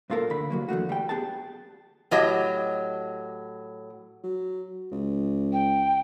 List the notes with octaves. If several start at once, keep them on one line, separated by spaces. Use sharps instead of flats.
G2 A#2 F4 A4 A#4
D2 D3 B5
C2 F#3 A#3
E2 D3 A3 F#4
G3 G5
B3 G4 G#4 A5
A2 F#3 G4 D#5
F#3
C#2
G5